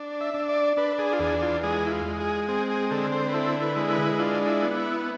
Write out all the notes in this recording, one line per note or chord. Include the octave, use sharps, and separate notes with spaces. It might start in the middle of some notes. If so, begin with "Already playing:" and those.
Already playing: D4
E5
D4
D5
D4 B4
G#4
F4
E2 G#4
F4
G#3 G#4
E4
F4
G#3
G#4
C4 G#4
G#4
D3 A4
C5
B4
E4 A4
B4
G#3
B4
D4 F4
E4
B3
E4